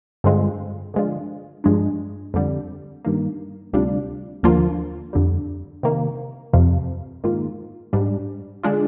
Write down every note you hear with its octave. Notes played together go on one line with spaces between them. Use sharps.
G2 D3 G#3 C4 F4
D3 F3 G#3 D4 F4
G2 F3 G#3 D4
F2 D3 G3
G2 D#3 A#3
D2 C3 G3 D4 F4
D#2 D3 F3 A#3 F4
F2 D3 G3
C3 D#3 A#3
F2 C3 F3
G#2 D#3 A#3 F4
G#2 G3 D4
D3 G#3 D4 F4